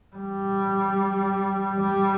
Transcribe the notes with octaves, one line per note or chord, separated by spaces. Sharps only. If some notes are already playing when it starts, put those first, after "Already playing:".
G3
G3